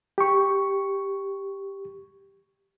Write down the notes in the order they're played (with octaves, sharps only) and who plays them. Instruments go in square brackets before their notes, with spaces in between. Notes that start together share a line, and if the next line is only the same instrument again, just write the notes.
[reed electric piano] G4 C#6